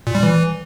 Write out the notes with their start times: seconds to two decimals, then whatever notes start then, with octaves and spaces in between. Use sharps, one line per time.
0.07 A#2
0.15 G3
0.23 E3